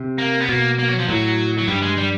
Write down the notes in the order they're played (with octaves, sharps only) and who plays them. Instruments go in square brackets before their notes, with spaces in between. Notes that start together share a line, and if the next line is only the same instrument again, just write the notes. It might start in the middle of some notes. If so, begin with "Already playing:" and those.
Already playing: [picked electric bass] C3
[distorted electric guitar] A#3
B3
[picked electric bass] B2 [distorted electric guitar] A#3
[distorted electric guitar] A#3
F#3
F3
[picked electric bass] A2 [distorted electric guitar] F#3
[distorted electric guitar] F#3
[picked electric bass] G2 [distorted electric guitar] G3
[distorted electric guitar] G#3
G3